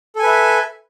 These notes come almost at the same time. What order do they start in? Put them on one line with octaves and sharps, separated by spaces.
A4 G#5 B4 E5